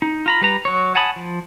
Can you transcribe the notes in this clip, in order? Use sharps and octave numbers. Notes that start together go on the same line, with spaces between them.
D#4
F4 A#5 B5
G3 B4 A#5
F#3 C#5
F#5 G#5 A5 B5 D#6
F3